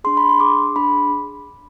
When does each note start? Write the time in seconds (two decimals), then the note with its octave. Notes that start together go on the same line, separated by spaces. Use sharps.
0.04 D4 G#4 C6
0.17 B5
0.29 C6
0.40 D4 G#4 D6
0.76 D4 G#4 B5